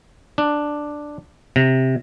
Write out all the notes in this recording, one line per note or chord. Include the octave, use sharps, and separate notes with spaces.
D4
C3